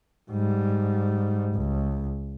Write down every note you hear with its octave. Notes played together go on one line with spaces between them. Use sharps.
G#2 G3
C#2